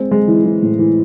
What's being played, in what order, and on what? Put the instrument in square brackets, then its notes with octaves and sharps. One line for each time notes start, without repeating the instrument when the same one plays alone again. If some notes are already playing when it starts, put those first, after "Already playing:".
Already playing: [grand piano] G#3 C4
G#3
E3
E3
A2
E3